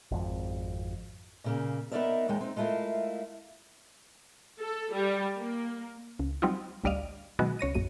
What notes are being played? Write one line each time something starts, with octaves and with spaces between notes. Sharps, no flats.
G#1 F2
A#2 C#3 A#3
B3 D#4 F#4 A#4 D5 E5
D#2 G#3 G5
C4 D#4
G#3 A3 E4 F4 A#4 F5
A4
G3
A#3
C#2
F#3 G3 C4 D#4 F4
A1 D2 G3 D5 D#5 F5
B2 D#3 F#3 G#3 B3 F#4
C#2 C#5 A#6 D#7
A#1 F#2 D#7